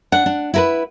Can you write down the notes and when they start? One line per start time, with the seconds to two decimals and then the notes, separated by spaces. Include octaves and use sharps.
0.12 D4 F#5
0.26 D4
0.54 E4 A#4 B4